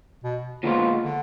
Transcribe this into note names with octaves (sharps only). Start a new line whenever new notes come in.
B2
A#2 D3 F3 G#3 B3 F4
D3